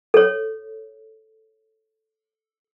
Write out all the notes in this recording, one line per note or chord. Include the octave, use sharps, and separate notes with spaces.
A4 C#5